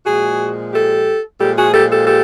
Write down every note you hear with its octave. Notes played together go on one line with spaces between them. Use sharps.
A#2 F3 G#3 F#4 G#4
G4 A4
A#2 F3 G#3 G4 A4
F#4 G#4
G4 A4
G4 A4
G4 A4